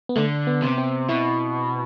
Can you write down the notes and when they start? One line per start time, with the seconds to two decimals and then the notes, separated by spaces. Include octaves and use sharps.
0.09 B3
0.16 D3 A3
0.47 B3
0.62 C3
0.78 C4
1.09 B2 E4